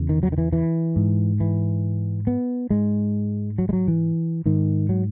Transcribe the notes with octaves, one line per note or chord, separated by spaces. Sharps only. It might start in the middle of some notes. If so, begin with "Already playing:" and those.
Already playing: E2 C#3
D#3
F#3
D#3
E3
E3
G#2
E3
B3
G#2 G#3
F#3
G#3
F#3
E3
G#2 D#3
F#3